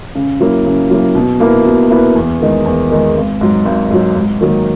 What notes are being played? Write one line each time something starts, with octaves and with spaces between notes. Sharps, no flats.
C#3
F#3 A#3 E4
C#3
F#3 A#3 E4
B2
A#3 E4 B4
B2
A#3 E4 B4
E2
D#3 G#3 D#4
E2
D#3 G#3 D#4
G#1
G#2 F#3
G#1
G#2 F#3
G#2
D#3 F#3 A#3